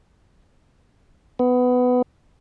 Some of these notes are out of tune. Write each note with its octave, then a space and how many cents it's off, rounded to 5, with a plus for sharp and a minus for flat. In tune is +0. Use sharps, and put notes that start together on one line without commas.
B3 +15